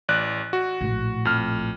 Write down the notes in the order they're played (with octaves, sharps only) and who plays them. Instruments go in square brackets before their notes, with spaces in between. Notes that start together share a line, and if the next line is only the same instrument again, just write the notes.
[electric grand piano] A1 D5 F#6
F#4
[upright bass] A#1 A2
[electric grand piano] F2 F6